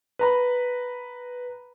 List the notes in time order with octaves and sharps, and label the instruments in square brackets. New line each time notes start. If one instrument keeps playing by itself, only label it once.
[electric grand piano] B4 A#5 B5